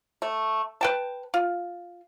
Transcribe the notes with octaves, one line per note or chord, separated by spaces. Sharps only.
A3
B4 G5 A5
F4